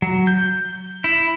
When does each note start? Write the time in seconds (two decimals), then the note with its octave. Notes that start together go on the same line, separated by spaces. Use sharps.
0.02 F#3
0.27 G6
1.04 E4